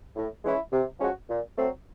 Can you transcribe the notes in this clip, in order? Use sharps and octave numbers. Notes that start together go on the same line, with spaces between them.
A2
E3 G#3 C#4 E4
C3
F3 G#3 C#4 F#4
A#2
F#3 A3 C4